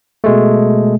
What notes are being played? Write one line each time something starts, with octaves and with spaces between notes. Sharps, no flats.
B2 G#3 A3